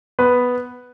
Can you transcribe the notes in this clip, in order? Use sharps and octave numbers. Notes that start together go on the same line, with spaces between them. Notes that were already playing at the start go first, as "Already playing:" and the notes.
B3 B4